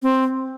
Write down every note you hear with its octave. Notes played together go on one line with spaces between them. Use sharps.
C4